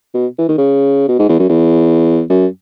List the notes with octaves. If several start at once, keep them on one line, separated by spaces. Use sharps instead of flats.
B2
E3
D#3
C#3
B2
G#2
E2
F#2
E2
F#2